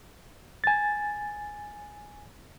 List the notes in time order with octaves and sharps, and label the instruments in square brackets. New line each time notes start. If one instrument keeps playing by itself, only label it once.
[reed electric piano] G#5 A6